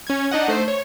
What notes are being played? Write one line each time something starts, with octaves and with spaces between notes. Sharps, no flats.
C#4 G#6
D4 D#4 D#5 F#5
A3 C5
C#5